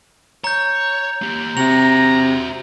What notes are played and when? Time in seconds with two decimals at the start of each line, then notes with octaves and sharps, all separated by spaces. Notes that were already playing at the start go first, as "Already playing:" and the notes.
0.44 C#5 A#5 G6
1.22 A#3 G4
1.57 C3 F#4 E5 A#5 F7